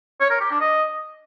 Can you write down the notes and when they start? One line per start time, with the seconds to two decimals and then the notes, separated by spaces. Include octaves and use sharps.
0.20 C#5
0.30 A#4
0.40 G4
0.50 D4
0.60 D#5